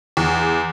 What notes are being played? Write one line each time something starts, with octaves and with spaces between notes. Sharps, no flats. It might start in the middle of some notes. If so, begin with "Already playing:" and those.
E2